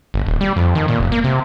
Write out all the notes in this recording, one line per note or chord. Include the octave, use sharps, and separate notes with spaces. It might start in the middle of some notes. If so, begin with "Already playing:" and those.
G1
D#1
G3
F2
D#3
A#2
F1
A#3
C3